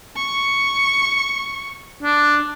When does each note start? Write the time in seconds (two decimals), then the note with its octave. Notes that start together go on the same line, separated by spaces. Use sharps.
0.16 C#6
2.03 D4